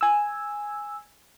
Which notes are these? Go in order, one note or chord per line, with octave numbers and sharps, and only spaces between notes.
G#5 E6